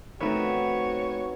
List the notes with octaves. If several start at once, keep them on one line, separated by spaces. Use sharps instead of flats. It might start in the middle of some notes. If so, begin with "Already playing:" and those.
B2 F3 A3 C4 D#4 F#4 B4 C#5